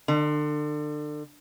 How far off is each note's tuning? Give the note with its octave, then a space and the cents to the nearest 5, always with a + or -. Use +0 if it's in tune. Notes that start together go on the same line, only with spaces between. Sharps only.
D3 +30